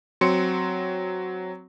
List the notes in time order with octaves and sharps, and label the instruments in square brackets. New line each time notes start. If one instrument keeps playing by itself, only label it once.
[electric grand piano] F#3 C4 C6 C#7